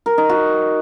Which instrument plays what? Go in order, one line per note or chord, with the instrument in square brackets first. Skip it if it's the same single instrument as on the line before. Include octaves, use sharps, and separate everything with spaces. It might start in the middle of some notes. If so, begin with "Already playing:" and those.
[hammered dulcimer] A#4
D#4
F#4